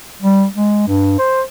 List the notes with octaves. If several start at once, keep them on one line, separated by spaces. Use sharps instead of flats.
G3
G#3
G2
C5